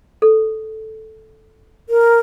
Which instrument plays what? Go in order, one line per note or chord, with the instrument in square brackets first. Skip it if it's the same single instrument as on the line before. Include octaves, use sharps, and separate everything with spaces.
[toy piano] A4
[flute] A#4